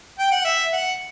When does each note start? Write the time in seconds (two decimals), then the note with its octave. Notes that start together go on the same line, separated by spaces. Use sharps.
0.19 G5
0.32 F#5
0.45 E5
0.73 F#5